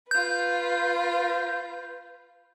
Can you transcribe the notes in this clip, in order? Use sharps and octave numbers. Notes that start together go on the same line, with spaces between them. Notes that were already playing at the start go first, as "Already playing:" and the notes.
F4 B4 G6